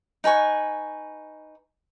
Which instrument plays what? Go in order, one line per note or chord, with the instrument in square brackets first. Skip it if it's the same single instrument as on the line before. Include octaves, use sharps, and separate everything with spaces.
[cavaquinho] D#4 B4 G#5 C#6